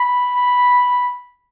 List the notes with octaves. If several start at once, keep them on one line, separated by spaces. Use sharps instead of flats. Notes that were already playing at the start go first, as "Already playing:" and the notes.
Already playing: B5